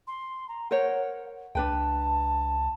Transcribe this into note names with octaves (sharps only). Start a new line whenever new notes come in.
C6
A#5
A#4 C5 C#5 F#5
C#2 D4 B4 G5 A5